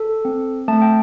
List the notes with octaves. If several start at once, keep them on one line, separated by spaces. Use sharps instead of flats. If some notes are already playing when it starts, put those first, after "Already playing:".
Already playing: A4
C4
A3 A5
G5